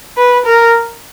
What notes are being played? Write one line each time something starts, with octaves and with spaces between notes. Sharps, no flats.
B4
A#4